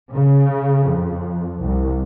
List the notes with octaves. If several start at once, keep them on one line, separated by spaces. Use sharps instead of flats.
C#3
F2
C2